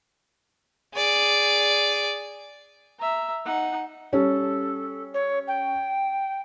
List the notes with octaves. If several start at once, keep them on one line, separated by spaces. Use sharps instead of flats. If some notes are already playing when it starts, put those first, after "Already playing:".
G#4 D5
E5 A#5
D#4 F#5
G3 C#4 A4
C#5
G5